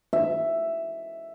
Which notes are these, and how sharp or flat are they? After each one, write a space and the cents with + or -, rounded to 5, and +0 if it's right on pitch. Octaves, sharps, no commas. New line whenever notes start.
E5 +5